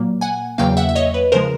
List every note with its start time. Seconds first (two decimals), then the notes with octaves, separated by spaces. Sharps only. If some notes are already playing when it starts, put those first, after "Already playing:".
Already playing: A#2 F#3 A#3
0.21 F#5 G#5
0.58 E2 C#3 F#3 A#3 F5 G5
0.77 E5 F#5
0.89 E5
0.95 C#5 D#5
1.14 B4
1.32 C#3 F3 G#3 A#4 C5